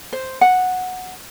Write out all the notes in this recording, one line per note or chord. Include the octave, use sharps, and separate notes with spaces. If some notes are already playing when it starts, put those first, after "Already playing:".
C5
F#5